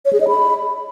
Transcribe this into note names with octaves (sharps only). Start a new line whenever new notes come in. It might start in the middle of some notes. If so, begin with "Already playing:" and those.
C#5
G#4
D#5
B5